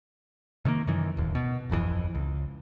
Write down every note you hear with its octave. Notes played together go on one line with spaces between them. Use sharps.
C3 D#3 G#3 A#3
F#2 D#3 E3
D1 D#2
B2
D1 G1 F2 E3
C#2